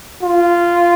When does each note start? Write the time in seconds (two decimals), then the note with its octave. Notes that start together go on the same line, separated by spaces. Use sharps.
0.23 F4